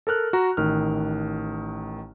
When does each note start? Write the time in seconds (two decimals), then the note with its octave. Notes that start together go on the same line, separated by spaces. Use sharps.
0.07 A4 A#4 F6 F#6
0.33 F#4 A#5
0.57 A1 D#3 F6